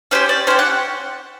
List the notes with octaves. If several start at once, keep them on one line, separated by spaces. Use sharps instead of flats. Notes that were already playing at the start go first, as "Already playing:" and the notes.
C#4 E4 G4 C5
D5
C#4 E4 G4 C5
F#5